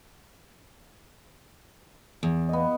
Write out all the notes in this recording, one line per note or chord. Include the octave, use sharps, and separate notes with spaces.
E2
B3 D#5